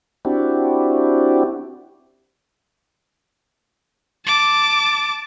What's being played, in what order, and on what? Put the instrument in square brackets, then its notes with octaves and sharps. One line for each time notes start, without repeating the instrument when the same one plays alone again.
[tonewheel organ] C4 D4 E4 F#4 G4
[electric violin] A5 D6